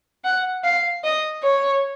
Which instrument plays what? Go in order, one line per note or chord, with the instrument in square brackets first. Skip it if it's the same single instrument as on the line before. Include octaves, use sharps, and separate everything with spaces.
[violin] F#5
F5
D#5
C#5